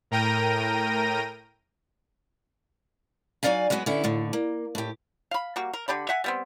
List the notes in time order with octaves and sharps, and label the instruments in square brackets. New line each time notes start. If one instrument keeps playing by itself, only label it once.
[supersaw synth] A2 A#4 G5 A#5 A#6 D#7
[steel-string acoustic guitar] F#3 A3 D#4 D5 F5 G#5
F#3 G#3 B3 F#4 G#4
D3 B3 C#4 E4
D#2 A2 D3
A#3
A2 G4
[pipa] F5 B5
G3 A#3 F#4
A#4
D3 G4 D5 B5
E5 F#5 G#5
G3 B3 C4